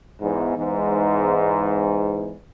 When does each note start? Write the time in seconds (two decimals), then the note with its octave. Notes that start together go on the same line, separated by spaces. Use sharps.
0.21 E2 G#2
0.57 E2 G#2